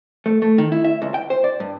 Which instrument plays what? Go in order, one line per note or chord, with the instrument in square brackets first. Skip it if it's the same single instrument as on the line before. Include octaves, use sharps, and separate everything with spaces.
[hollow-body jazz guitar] A3
A3
D#3
E4
E5
C#2
G5
C5
D5
G2